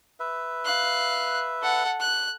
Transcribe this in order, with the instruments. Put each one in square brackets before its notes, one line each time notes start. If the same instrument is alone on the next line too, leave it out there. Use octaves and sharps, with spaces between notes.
[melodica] B4 E5
[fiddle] F5 F#6
A4 F#5
F#6